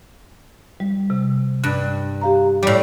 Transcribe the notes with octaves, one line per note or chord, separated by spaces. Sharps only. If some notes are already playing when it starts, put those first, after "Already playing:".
G3
C3
G2 F#6
G4 F5 A#5
A2 G3 D6